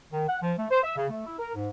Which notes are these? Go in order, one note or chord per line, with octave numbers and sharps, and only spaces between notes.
D#3
F#5
F3
A3
C5
E5
C#3
A3
E4
A#4
G#2